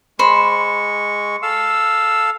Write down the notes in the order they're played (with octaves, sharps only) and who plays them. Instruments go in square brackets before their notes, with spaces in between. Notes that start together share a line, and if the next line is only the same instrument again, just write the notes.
[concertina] G#3 C#6 [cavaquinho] C5 B5
[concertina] A4 F5 E6